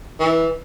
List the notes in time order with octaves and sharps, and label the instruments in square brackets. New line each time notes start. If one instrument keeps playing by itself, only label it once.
[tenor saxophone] E3